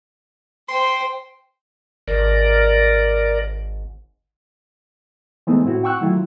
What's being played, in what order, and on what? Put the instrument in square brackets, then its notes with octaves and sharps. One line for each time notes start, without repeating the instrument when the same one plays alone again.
[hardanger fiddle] C5 G5 [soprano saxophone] C6
[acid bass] G#1 [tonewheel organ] A#4 D5
[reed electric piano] E3 G#3 A3 B3 C4 D#4
A2 C4 E4 F#4
F#5 G5 C#6 E6 F#6
D#3 F#3 A3 E4 F4